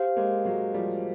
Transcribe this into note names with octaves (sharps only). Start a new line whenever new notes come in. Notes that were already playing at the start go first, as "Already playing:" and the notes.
Already playing: G4 C5 F5
G#3 A#3
F#3 G#3
F3 G3